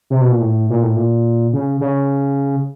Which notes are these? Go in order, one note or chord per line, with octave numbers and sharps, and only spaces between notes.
C3
B2
A#2
A2
A#2
A2
A#2
C#3
C#3